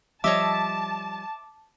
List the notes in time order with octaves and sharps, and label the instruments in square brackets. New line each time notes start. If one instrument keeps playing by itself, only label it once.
[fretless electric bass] F3 G3 [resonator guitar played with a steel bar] C#5 D#5 E5 [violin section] A5 [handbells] D6